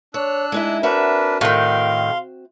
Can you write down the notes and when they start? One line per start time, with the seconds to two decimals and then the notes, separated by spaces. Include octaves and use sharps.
0.14 D4 C#5 E6 F#6
0.52 G#3 D#4 E4
0.83 C4 D4 F#4 A#4 B4 E5
1.41 A2 D#3 F5 C6